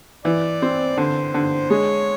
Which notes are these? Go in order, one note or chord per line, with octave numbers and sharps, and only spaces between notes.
E3 D5
C4
D3 C5
D3
G#3 C#5